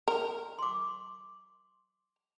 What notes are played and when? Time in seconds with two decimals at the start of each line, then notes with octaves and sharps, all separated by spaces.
0.08 A#4
0.59 C6 D6